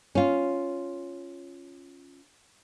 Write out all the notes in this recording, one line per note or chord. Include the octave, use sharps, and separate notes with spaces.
C#4 F4